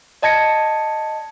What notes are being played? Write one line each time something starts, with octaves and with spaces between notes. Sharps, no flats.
D5 D#5 A5 G#6 A#6 C#7